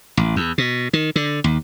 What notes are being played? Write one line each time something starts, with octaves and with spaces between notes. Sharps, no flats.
A1
E2
B2
D#3
D3
D#2